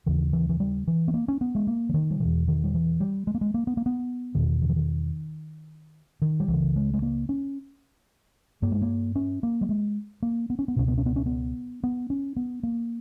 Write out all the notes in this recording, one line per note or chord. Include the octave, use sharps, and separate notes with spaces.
D#2 C#3 E3
E3
E3
G3
E3
B3
A#3
C#4
B3
G#3
A#3
E3
D#3
G3
E2 B2 E3
D#3
G3
E3
G3
G#3
A#3
G#3
A#3
B3
A#3
B3
E2 B2 D#3
D#3
E3
D#3
D#3
G3
C#2 E3
C#3
G#3
G#3
A#3
C#4
G2 A#3
G#3
A#3
C#4
A#3
G3
G#3
A#3
B3
C#4
B3
C#2 B2 C#4
B3
C#4
B3
C#4
B3
B3
C#4
B3
A#3